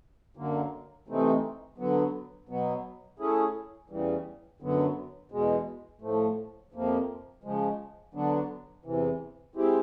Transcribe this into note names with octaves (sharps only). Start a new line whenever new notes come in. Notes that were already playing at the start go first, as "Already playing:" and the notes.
F#2 D3 F#3 A#3
C3 E3 A3 C4 D#4
D3 F#3 B3
B2 F#3 B3
A3 C#4 E4 G#4
E2 C#3 E3 G3
F#2 D3 F#3 B3
E2 B2 G#3
A2 F3 A3
F2 C3 F3 A#3
C#3 F3 G#3
D3 F#3 B3 D4
E2 C3 E3
G#3 C4 E4 G4